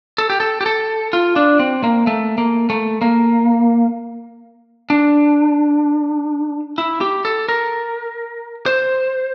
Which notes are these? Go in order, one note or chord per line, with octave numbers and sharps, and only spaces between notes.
A4
G4
A4
G4
A4
F4
D4
C4
A#3
A3
A#3
A3
A#3
D4
E4
G4
A4
A#4
C5